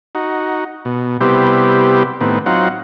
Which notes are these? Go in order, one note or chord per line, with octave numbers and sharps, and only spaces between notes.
D#4 F#4
B2
C3 G3 B3 E4 G4 C5
A2 D#3 B3 C4
F#3 C4 D#4 F4 F#5